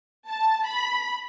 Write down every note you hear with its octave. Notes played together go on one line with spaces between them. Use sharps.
A5
B5